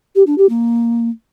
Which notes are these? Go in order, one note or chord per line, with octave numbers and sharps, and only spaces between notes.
G4
D4
G4
A#3